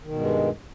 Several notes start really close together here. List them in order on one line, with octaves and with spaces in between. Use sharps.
D#3 B2 G2 G#3